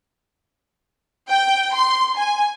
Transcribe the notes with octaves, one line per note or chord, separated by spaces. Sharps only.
G5
C6
G#5